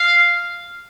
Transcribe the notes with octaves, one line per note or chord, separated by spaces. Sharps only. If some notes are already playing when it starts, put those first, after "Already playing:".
Already playing: F5